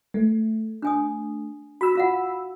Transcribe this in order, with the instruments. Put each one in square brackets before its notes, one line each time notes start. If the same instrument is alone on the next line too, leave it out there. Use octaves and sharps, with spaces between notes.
[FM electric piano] A3
[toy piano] D4 G#5 D#6
[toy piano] F#4 [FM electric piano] B5 E6
[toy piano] F4 F5 F#5